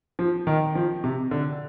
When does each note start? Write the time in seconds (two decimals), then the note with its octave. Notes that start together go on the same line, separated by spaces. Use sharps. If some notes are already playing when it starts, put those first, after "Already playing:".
0.19 F3
0.47 D#3
0.75 F3
1.04 C3
1.31 D3